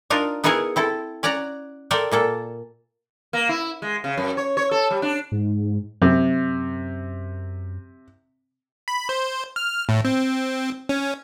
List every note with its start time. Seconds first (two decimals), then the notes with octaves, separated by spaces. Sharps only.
0.10 D4 D#4 F4 A#4
0.44 B3 D#4 E4 F#4 G#4 A#4
0.76 C4 E4 A4
1.23 C#4 D5 F#5 A#5
1.91 A4 A#4 C5 D5 E5 G5
2.12 A#2 A#3 A4
3.33 A#3
3.49 E4
3.82 G#3
4.04 C#3
4.17 F#2
4.37 C#5
4.57 C#5
4.71 A4
4.91 G3
5.02 D4
5.32 G#2
6.02 F#2 C3
8.88 B5
9.09 C5
9.56 F6
9.89 A2
10.05 C4
10.89 C#4